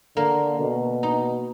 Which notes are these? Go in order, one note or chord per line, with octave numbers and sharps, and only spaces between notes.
D3 A#3
B2
D#4